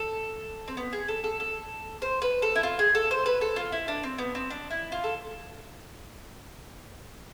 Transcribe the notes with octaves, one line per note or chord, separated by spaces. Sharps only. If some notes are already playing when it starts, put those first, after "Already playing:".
Already playing: A4
C4
B3
G#4
A4
A4
A4
C5
B4
A4
E4
F4
G#4
A4
C5
B4
A4
F4
E4
D4
C4
B3
C4
D4
E4
F4
A4